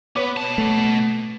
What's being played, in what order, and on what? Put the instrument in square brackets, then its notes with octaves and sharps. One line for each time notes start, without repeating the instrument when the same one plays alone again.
[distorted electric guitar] B3 [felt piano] B4 C#5 D6
[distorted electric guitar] B2 A5
[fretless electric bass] A3